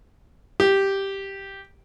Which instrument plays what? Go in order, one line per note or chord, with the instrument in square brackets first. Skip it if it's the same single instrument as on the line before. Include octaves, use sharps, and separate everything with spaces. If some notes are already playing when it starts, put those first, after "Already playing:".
[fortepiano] G4